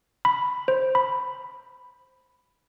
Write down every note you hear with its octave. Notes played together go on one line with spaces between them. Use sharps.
B5
C5
B5